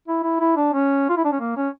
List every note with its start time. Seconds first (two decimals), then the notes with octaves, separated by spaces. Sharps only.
0.08 E4
0.23 E4
0.40 E4
0.57 D4
0.73 C#4
1.09 F4
1.17 E4
1.24 D4
1.32 C#4
1.40 A#3
1.57 C#4